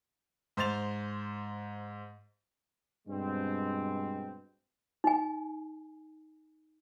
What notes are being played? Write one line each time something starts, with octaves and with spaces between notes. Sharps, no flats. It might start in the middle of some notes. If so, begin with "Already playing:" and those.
G#2 C5 C6 A6 F7
G2 B2 G#3 C4
D#4 G#5